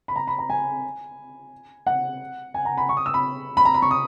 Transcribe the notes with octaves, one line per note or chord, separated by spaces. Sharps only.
B5
A#5
B5
A#5
G#5
F#5
G#5
A#5
B5
C#6
D#6
E6
B5
B5
A#5
B5
C#6
D#6